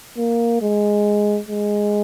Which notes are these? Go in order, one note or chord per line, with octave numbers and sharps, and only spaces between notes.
A#3
G#3
G#3